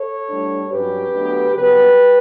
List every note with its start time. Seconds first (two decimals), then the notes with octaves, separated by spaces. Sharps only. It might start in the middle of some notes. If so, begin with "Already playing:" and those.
Already playing: A4 C#5
0.29 A2 G3 D4
0.71 G2 F#3 C#4 G4 B4
1.13 D2 D3 F#3 B3
1.55 C#3 F#3 B3 G4 B4